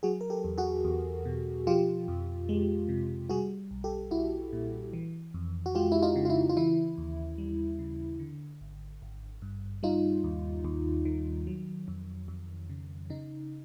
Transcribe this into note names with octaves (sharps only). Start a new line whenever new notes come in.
F#3 F#4 G#4
A#4
G4 A4
E2
F#4 G#4
E2
B2
F3 F4 G4
F2
G#3
C3
G3 F#4 G#4
B1
G4 A4
B1 E4 F#4
A#2
E3
F2
F#4
G#3 F4 G4
E4
D#4 F4
C#3
F4
E4
F4
E3 E4
D#2
G3
C#3
D3
G#1
G#1
G2
G3 D#4 F4
D#2
D#2
D#3
F#3
F2
F2
C#3
C#3 D#4